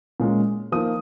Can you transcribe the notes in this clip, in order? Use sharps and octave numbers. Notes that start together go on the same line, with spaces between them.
A#2 G#3 C#4
F3 A#3 D#4 D#6